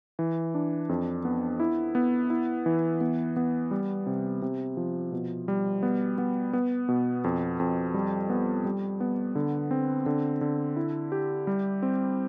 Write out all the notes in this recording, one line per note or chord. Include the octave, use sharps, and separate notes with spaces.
E3
D4
F2
B3
E4
B3
E4
E3
B3
B3
G3
C3
C3
F3
B2
G3
B3
B3
B3
B2
F2
F2
G3
B3
G3
B3
D3
C4
D3
D3
E4
G4
G3
C4